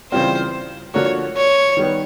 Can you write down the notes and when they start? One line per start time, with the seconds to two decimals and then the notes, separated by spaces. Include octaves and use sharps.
0.12 C#3 E3 G3 C4 F4 C5
0.94 D3 F3 A#3 D4 F#4 C#5
1.37 C#5
1.77 D#3 G3 B3